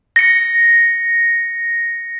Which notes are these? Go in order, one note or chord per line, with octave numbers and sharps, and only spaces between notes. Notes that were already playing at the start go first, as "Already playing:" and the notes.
A#6 C#7